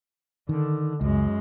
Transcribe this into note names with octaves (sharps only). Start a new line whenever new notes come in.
D3 D#3
C#2 F#2 G#3